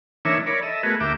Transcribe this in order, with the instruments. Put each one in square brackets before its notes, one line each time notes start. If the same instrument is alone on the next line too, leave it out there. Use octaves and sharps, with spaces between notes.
[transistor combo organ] E3 A#3 D4 D#4 C#5 E5
A#4 C#5 D5 B5
A4 D#5 E5
A3 B3 F#4 G#4 A#4 B4
D2 A#3 G4 E5 D6